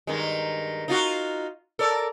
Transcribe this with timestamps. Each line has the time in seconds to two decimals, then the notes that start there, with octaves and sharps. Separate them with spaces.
0.07 G2 D#3 G#3
0.88 D#4 F4 F#4
1.79 A4 A#4 D5